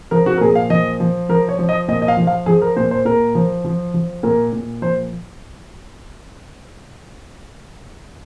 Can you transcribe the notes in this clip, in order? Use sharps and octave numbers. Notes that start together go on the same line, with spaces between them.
F3 A#4
F#4
A#4
A#2 G#4
F5
F3 D#5
F3
F3 A#4
C#5
F3
D#5
A#2 D#5
D#5
F5
F3
F5
F3 G#4
A#4
A#2 C5
C5
A#2 A#4
F3
F3
F3
A#2 A#4
A#2
F3 C5